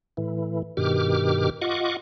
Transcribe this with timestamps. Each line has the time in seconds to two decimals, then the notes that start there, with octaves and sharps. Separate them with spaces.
0.17 A2 E3
0.77 G2 B2 D#3 G4 D6 F6
1.62 F4 D#5 F#5 C#6 D6